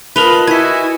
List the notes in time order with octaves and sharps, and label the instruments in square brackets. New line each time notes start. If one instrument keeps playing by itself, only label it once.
[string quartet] F4 D#5 A5 [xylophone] A#4 F7 G7 [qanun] B4 [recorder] B5
[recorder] E4 [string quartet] F#4 G#5 [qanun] D#5 [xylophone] G#6 B6